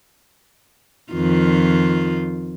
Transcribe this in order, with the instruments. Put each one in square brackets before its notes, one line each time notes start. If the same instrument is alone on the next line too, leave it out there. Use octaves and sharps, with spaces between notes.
[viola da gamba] F2 D#3 F4